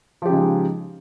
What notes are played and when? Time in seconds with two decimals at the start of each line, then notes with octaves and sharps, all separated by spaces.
0.22 F3
0.26 G4
0.29 C#3
0.33 G#3
0.36 D#4